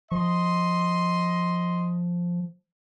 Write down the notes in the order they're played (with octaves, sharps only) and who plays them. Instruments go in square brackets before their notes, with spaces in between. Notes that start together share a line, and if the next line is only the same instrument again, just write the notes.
[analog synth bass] F3 [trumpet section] D#5 C6